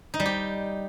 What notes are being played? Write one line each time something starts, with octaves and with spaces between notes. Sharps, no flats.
D#4
G3
G4